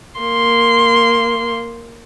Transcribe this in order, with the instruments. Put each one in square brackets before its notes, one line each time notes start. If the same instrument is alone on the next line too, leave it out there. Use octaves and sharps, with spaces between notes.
[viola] A#3 C6